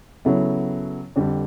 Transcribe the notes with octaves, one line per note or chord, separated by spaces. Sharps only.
C#3 F#3 B3 E4 A4
F2 D3 G3